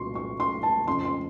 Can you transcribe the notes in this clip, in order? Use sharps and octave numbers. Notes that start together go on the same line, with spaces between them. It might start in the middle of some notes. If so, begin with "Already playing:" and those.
Already playing: C2 A#2 F#3 C6 C#6
C#6
C6
A5
F2 C#3 F3 C6
C6